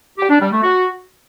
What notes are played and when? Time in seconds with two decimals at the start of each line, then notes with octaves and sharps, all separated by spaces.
0.19 G4
0.30 D4
0.41 G3
0.52 A3
0.63 F#4